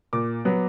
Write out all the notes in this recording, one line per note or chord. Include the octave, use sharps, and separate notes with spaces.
A#2 D6
F#3 B3